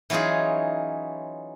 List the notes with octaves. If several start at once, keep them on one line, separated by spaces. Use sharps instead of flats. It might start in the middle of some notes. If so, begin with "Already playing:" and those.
E3 F#3 C#4 D#4 F4 G#4